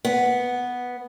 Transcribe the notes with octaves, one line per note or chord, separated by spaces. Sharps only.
B3